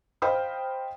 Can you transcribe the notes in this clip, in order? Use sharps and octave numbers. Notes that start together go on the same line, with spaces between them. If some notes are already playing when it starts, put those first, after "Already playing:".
C5 D#5 F5 G5 B5 D#6